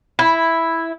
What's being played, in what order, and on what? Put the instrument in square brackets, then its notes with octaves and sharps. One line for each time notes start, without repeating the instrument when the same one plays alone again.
[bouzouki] E4